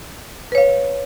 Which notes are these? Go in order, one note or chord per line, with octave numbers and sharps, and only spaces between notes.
B4 C#5 F5